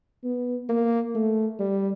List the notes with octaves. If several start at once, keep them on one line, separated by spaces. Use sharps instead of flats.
B3
A#3
A3
G3